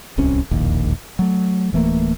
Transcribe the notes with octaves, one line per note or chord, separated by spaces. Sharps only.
D1 C2 C3 C#4
E1 A#1 D#2
F#3 A3
D1 E3 A3 A#3